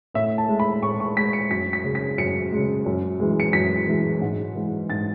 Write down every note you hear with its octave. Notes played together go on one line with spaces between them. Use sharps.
A2 E5
A5
G#3
B5
A2 C#6
C#6
G#3 B6
C#7
F#2 B6
B6
C#3 G#3
B6
F#2 C#7
C#3 G#3
F#2
E3 G#3
C#7
F#2 B6
E3 G#3
G#2
E3 G#3
G#2 A6